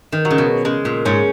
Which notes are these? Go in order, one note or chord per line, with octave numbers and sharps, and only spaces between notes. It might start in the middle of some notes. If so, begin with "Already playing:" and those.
D#3
F#3
C#3
B2
C#3 G#3
A#2
G#2 C#4